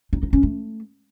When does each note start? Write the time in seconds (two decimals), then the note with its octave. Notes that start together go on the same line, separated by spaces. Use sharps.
0.13 D#4
0.23 D#4
0.33 C#4
0.43 A3